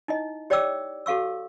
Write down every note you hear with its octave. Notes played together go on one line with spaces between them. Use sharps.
D#4 E4 D#5
G4 C#5 D5 G5 D6 E6
F#4 A4 F5 C#6 E6